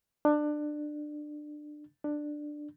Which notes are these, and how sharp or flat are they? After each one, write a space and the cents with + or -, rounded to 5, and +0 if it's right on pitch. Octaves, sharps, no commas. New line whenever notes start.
D4 +20
D4 +10